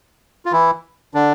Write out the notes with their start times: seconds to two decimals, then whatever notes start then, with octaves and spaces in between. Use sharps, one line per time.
0.46 F4
0.52 E3 E4
1.14 D3 D4